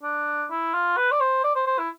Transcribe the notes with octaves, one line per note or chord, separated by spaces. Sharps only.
D4
E4
F4
B4
D5
C5
D5
C5
C5
E4